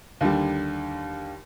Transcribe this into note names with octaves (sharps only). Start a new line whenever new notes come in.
D#2 D3 G3